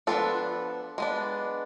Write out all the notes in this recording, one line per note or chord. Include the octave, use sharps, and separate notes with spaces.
F3 B3 D4 A4
G#3 B3 D4